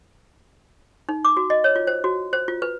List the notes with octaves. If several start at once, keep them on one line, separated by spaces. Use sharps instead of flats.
D#4
D6
F#4
D#5
C#5
F4
C5
F#4
C5
F4
B4